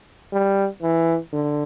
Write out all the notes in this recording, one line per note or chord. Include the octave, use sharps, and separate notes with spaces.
G3
E3
D3